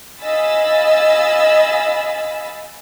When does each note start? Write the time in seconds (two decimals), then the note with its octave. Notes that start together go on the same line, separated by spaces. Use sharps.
0.22 D#5 F5 G#5 B5 E6 A6